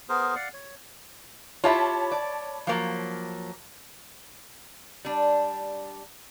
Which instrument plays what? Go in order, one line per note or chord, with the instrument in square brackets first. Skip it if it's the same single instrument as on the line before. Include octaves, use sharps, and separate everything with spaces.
[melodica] B3 G#4 A#4 C5
D5 F5 F#5
C#5
[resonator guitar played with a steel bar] F4 G4 E5 [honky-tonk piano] C#5 A5 B5
[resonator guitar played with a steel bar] D5
F3 F#3 A#3
G3 D4